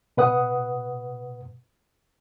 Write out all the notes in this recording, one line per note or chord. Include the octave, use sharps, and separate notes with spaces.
B2 B4 F#5 D#6